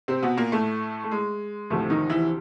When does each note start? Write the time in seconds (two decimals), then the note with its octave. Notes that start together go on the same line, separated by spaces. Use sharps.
0.08 C3 C4
0.23 B2 B3
0.37 A#2 A#3
0.52 A2 A3
1.04 A3
1.11 G#3
1.70 D2 A2 C3 F3 A3
1.90 D#3 D#4
2.10 E3 E4